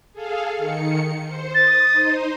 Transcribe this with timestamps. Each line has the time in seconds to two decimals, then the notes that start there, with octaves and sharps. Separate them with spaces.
0.13 G#4 A4 F5
0.57 D#3 C#7
1.26 C5
1.55 D#6 A6
1.91 D#4 C5